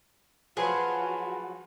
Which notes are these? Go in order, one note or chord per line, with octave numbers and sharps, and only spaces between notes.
F3 F#3 F4 F#4 G#4 B4